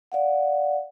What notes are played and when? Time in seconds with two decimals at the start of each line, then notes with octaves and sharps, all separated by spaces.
0.12 D5 F5 F#5